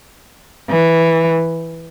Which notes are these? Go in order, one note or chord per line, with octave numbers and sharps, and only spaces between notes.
E3